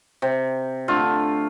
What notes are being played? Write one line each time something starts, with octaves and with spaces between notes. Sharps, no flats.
C3
D3 A3 F4